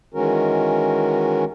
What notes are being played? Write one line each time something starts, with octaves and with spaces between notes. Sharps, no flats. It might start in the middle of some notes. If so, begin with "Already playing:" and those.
D#3 E3 G#3 C#4 F#4 A#4